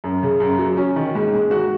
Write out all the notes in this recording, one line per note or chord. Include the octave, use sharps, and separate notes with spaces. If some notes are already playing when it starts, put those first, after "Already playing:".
F#2
C#3
F#2
F#3
C#4
D#3
G#2
G#3
F#4